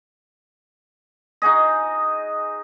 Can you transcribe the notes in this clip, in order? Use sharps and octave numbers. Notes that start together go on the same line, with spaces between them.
D#4 F#4 G#4 D#5